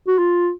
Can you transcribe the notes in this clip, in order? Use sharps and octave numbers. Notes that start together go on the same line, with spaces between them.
F#4
F4